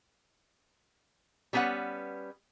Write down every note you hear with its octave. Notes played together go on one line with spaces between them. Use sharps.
G3 B3 C#4 B4 F#5